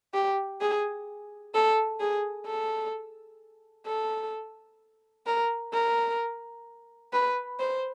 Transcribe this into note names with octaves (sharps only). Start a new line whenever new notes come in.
G4
G#4
A4
G#4
A4
A4
A#4
A#4
B4
C5